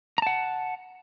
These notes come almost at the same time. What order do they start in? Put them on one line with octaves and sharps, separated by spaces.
A#5 A5 F#5